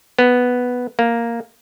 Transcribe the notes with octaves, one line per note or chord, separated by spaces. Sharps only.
B3
A#3